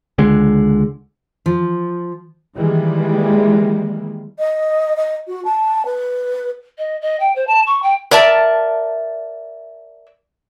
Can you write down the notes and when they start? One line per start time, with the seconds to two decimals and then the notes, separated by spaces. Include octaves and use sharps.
0.18 C#2 D3 G#3
1.46 F3
2.54 D#3 E3 G3 G#3 A#3
4.39 D#5
4.97 D#5
5.28 F#4
5.45 A5
5.85 B4
6.78 D#5
7.02 D#5
7.20 G5
7.36 C5
7.47 A5
7.67 C#6
7.83 G5
8.11 A#4 D5 E5 A5